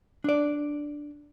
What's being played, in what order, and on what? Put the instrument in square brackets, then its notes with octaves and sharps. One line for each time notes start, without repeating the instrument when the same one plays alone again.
[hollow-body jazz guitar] D4 D5